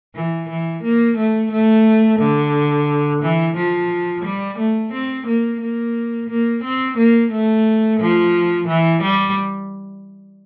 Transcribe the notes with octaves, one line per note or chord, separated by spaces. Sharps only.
E3
E3
A#3
A3
A3
D3
E3
F3
G3
A3
C4
A#3
A#3
A#3
C4
A#3
A3
F3
E3
G3